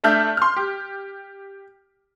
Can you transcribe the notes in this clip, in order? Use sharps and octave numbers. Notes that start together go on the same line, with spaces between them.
A3 D4 E5 F6 G6
C6 F6
G4